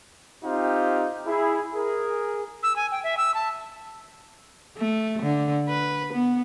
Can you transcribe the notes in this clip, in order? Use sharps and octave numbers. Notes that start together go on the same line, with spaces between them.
C4 D#4 F4 G4
E4 G#4
G#4 A#4
E6
G#5
G5
E5
E6
A5
A3
D3
B4
B3